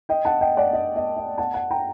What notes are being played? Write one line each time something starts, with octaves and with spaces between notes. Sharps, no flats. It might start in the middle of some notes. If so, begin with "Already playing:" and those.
D#5 G5
F#5 A5
D#5 G5
D5 F#5
D#5
D#5
D#5
F#5 A5
F#5 A5
G5 A#5